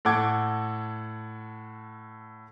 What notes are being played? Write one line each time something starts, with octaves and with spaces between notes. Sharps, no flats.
A2 A4 F#5 D6 G#6